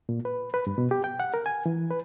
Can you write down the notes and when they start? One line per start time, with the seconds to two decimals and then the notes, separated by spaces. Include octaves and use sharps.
0.09 A#2
0.25 B4
0.54 B4
0.67 G2
0.78 B2
0.91 G4
1.04 G5
1.20 F#5
1.34 A#4
1.46 G#5
1.66 E3
1.90 B4